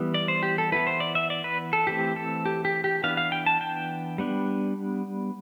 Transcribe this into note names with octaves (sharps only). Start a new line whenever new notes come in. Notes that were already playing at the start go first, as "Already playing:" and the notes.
Already playing: E3 G3 B3
D5
C5
G4
A4
E3 B3 E4 B4
C5
D5
E5
D5
B4
A4
E3 A3 C4 G4
A4
G4
G4
G4
E3 B3 D4 F5
F5
G5
A5
G5
G3 B3 D4